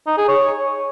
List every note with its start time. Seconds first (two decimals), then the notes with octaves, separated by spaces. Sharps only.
0.07 D#4
0.17 G#4
0.28 C#5